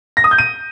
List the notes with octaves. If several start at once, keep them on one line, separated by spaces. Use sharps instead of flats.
A#6
D#6
G6
D#7